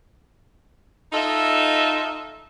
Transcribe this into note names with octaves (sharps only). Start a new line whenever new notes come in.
D#4 F4 A4 D#5 E5